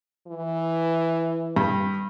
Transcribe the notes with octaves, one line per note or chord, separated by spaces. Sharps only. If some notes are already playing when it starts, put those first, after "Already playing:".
E3
G2